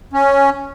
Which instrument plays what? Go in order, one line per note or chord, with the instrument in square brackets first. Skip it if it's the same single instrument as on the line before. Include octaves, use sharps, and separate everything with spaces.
[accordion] C#4